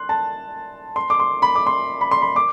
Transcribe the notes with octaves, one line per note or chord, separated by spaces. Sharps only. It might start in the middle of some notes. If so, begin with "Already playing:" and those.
Already playing: C6 F#6
A5
C6
D6
C6
B5
D6
C6
B5
C6
B5
D6